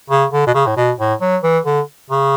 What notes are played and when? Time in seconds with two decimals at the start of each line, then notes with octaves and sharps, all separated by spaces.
0.10 C#3
0.32 D3
0.47 B2
0.54 C#3
0.67 A2
0.76 B2
0.99 A2
1.21 F#3
1.43 E3
1.65 D3
2.10 C#3